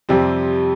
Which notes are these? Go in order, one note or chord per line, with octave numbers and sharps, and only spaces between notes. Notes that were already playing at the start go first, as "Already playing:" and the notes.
F2 C3 G3 C4